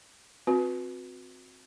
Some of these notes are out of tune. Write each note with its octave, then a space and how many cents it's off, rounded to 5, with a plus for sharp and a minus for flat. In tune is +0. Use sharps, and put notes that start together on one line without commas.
C4 +0 F#4 -30 B4 +0